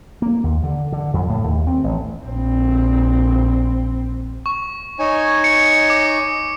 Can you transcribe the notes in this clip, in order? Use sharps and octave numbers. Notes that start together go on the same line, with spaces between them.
A#3
D#2
D3
D3
F2
A2
D#2
C4
A1
A#1 C4
C#6
D#4 C#5 G#5
C#7
D6